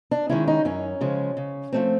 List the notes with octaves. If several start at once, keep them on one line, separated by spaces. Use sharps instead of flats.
D4
D#3 G#3 C#4 E4
D#4
F#2 C#4
C#3 F3 G#3
C#3
F3 A3 C4